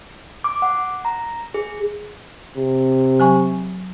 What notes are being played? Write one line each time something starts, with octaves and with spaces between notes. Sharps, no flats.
D6
F#5
A#5
G#4
C3
F#3 G#5 C#6